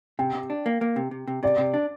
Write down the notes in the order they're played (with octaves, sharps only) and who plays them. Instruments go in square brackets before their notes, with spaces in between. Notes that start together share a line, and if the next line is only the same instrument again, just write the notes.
[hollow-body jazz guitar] C3 [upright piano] G5
[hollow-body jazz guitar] C3
D4
A#3
A#3
C3
C3
C3
[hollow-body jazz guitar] C3 [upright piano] D5
[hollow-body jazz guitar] C3
D4